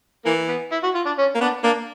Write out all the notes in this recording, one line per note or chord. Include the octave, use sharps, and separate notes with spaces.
E3 A#3
B3
E4
F#4
F4
D4
C#4
A#3
B3 D4
A#3 D4